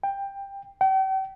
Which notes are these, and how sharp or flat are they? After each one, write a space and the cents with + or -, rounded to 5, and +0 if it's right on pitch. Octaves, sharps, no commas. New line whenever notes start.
G5 +15
G5 -40